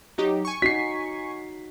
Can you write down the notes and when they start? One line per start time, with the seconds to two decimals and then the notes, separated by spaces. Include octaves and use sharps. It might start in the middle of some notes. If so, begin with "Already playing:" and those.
0.18 F#3 D#4 G4
0.45 G#5 C#6
0.62 D#4 F#4 B6 C7